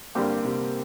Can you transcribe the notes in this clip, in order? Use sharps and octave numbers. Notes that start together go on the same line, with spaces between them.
G2 D3 G3 A#3 C4 G4
C3